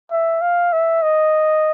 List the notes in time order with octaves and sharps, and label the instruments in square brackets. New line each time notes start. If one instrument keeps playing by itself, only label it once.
[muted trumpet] E5
F5
E5
D#5